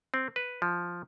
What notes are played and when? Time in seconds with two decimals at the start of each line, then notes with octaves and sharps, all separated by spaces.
0.14 C4
0.36 B4
0.62 F3